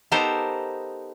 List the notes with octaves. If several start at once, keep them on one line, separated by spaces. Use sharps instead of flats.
B3 D#4 G4 A4 A#4 C5